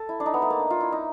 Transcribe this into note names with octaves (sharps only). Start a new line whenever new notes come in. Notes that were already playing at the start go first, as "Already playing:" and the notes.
Already playing: A4
E4
D4
D#4
B3
A3
A#3
D4
F4
E4
D#4